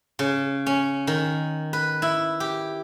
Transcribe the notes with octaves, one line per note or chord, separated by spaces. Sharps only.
C#3
C#4
D#3
B4
E4
G4